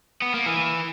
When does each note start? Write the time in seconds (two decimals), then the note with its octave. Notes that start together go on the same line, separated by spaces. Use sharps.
0.22 B3
0.34 A#3
0.46 E3